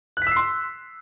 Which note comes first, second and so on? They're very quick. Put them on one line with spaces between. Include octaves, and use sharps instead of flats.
F#6 B6 E6 C7 C6